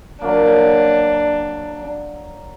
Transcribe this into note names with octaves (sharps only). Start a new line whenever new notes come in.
F#3 A#3 D4